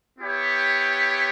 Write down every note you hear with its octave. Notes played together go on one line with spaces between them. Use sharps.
B3 E4 G4 C#5